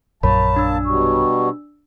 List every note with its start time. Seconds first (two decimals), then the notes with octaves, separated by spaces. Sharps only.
0.23 A#1 F#2 A#3 A#4 C#5 A5 B5
0.56 D4 E6
0.85 B2 F#3 G3 C#6